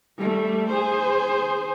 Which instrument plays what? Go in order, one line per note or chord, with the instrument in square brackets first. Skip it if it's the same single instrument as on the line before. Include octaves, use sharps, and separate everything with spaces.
[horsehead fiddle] G3 A3
G#4 C5